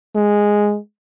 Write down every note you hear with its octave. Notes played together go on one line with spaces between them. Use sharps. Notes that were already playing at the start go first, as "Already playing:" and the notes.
G#3